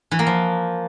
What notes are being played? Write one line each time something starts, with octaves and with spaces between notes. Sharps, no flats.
E3
A#3
F3